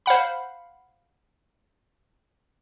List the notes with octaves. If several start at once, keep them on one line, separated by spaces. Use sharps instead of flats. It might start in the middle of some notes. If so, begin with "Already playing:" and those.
C5 F5 F#5 B5